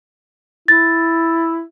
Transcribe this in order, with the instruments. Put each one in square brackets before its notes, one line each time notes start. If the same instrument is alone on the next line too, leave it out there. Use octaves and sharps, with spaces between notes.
[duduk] E4 [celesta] A6